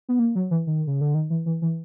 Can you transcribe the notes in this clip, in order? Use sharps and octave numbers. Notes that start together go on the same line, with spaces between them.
B3
A#3
F#3
E3
D#3
C#3
D3
D#3
E3
E3
E3